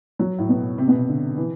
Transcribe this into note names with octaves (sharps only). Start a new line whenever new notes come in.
F#3
A2
B2
C3
B2
C3
D3
E3